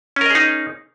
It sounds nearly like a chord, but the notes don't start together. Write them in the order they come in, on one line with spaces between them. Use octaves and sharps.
C#4 A#4 D#5 G#4 D#4